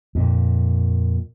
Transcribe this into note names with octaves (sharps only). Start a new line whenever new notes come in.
F2 A#2